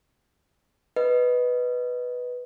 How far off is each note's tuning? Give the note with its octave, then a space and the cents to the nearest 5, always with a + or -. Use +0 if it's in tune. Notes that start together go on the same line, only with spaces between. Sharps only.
B4 +0 D#5 +0